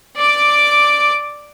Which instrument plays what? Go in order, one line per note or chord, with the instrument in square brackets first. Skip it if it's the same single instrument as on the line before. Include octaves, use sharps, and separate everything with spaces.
[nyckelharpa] D5 D6